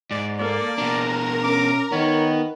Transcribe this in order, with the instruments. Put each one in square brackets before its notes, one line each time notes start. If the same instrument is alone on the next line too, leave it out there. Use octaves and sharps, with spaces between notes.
[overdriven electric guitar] G#2 [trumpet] D5
[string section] A#3 A4 [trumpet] D5
[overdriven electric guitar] B2 D4 [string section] A#4
[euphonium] C#4 [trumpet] D6
[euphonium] D#3 [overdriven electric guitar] B3 [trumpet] C#5